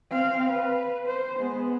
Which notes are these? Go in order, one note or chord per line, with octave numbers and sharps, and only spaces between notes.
C4 F5
B4
C5
G#3 B3